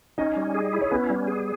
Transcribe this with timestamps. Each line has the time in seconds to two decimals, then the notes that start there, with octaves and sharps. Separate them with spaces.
0.18 C#4 D#4 D#5
0.37 G3
0.54 G#4
0.73 E4
0.81 C#5
0.91 B3 C#4 B4
1.10 G3
1.27 G#4